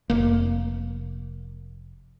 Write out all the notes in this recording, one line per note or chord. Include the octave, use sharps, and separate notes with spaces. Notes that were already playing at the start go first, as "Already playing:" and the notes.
F1 A#3